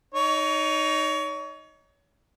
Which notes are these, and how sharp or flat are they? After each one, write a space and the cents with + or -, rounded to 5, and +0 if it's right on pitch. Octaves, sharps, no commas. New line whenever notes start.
D#4 +0 C#5 +30